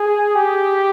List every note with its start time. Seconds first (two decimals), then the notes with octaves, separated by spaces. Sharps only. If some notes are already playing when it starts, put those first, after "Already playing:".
Already playing: G#4
0.35 G4